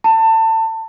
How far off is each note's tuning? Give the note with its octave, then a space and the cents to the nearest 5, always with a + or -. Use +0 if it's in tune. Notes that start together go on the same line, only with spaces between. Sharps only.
A5 +25